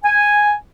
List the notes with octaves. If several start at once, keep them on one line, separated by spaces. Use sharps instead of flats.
G#5